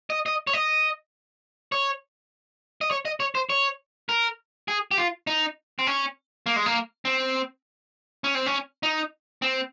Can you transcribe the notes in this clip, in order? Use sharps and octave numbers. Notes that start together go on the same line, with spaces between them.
D#5
D#5
C#5
D#5
C#5
D#5
C#5
D#5
C#5
C5
C#5
A#4
G#4
G4
F4
D#4
C4
C#4
A#3
G#3
A#3
C4
C#4
C4
C#4
D#4
C4